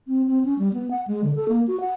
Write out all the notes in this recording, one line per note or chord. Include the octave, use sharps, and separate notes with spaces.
C4
C4
C#4
G3
B3
F#5
G#3
D3
A4
A#3
F#4
F#5